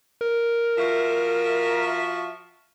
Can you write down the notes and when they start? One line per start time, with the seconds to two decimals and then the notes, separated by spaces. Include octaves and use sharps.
0.21 A#4
0.78 F3 F#4 E5